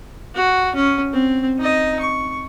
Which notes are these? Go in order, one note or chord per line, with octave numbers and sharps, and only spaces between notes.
F#4
C#4
C4
D#4 D#5
C#6